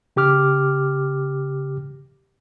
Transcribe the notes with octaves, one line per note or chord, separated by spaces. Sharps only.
C#3 G4 D6 F6